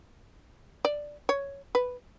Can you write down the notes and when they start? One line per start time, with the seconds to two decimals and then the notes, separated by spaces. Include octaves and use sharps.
0.85 D5
1.29 C#5
1.75 B4